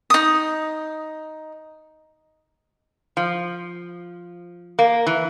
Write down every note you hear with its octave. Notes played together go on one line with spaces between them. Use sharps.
D#4 D#6
F3
A#3
E3